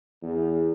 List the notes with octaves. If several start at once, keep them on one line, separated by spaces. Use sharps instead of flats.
E2